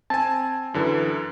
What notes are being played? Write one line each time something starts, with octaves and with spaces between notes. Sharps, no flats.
C4 G#5 A5
F#2 D3 E3